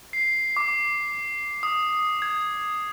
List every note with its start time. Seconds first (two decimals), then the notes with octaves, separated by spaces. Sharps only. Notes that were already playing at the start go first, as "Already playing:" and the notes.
0.13 C7
0.57 D6
1.63 D#6
2.22 G#6